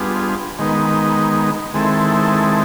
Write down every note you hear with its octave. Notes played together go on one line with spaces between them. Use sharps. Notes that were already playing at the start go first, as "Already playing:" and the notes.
Already playing: G3 B3 D4 F4 G#4
D#3 G#3 B3 D#4
D#3 G#3 C4 E4 A4